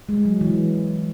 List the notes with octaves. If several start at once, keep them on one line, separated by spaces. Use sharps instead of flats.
G#3
F#3
E3